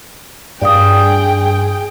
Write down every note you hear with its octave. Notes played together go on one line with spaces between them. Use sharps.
G2 G#4 D5 F5 G5 D#6